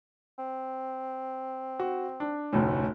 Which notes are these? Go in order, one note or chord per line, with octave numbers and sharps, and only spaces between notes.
C4
F#4
D4
F1 D2 A2 C#4